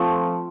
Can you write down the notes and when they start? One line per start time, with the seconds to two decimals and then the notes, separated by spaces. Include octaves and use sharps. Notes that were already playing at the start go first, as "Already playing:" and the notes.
Already playing: F3 A3 C4